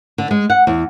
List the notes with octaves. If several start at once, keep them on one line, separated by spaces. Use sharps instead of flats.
D3
G#3
F#5
E2